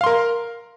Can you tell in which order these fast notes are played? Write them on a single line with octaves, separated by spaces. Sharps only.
F5 C6 A#4